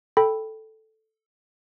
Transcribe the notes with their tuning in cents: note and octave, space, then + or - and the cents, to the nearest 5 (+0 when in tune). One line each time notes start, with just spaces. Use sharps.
A4 +0 G5 +0 B5 -5